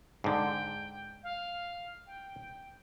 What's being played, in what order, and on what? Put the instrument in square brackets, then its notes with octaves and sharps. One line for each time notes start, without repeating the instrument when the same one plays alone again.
[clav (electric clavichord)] G#2 D3 [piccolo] G5
[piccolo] F5
G5